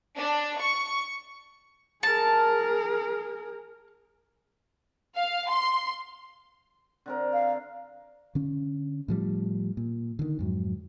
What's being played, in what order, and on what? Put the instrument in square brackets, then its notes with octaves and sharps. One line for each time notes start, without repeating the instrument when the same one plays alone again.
[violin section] D4
C#6
[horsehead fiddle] G#4 A#4 [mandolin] A5
[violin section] F5
C6
[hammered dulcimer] D3 C4 A#4
[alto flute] F5
[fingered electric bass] D3 C#4
A2 F3 G3
A#2
D3 D#3
F2 G#2 F#3